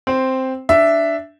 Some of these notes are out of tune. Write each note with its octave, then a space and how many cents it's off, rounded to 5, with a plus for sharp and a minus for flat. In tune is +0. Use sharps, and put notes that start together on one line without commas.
C4 +0 C5 +0
D4 +0 E5 +5